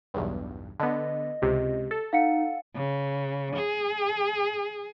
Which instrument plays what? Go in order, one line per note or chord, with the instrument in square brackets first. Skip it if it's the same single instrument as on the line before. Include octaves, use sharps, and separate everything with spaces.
[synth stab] B1 E2 G2
[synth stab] D3 B3 [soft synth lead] D#5
[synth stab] C#2 C3 [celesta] G4
[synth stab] A4
[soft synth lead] D#4 [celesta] F5 F#5 C#7
[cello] C#3
G#4